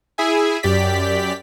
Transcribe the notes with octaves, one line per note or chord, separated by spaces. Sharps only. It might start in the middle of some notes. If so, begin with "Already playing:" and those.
E4 G#4 E5 G#5
F#2 G4 D5 B6